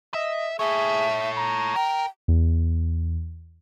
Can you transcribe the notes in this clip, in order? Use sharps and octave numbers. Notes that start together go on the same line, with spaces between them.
D#5 E5
G#4 A4 C#5 E5
A#5
A#4 G5
E2